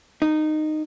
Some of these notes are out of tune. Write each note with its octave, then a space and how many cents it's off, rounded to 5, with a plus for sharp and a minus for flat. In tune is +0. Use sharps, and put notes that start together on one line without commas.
D#4 -15